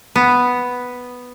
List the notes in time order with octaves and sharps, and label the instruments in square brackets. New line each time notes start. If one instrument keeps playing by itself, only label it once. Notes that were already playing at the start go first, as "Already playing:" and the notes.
[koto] B3